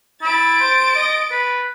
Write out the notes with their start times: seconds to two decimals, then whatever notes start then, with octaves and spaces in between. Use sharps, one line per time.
0.22 E4 A6 D7
0.60 C5
0.95 D#5
1.31 B4